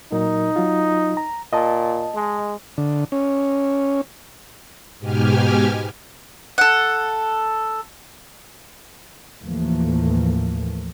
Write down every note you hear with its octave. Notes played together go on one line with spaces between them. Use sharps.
A#2 F#3 D#4 A#4
F#3 F4
A#5
A#2 D#5 A5
G#3
D3
C#4
G#2 B2 G4 G#5 F6
A4 F#5
D#2 A2 E3 F3 A3 A#3